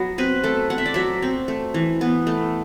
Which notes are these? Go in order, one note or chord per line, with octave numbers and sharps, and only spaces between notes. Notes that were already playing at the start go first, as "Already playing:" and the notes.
Already playing: F#3 B3
C4 B4
A3 A4
C4 F#5
E5
D5
F#3 E5
C4
A3
E3
B3
A3